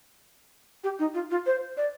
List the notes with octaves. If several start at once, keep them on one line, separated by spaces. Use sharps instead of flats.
G4
D#4
F4
F4
C5
D5